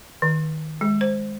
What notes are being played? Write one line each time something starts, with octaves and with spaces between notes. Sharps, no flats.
D#3
G#3
C5